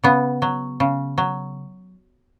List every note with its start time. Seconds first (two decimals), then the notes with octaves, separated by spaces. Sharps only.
0.04 C#3 B3
0.42 F#3
0.80 C#3
1.18 F#3